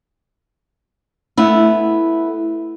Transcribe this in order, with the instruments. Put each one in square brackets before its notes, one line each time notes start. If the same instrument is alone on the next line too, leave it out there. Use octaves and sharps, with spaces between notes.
[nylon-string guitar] A3 B3 E4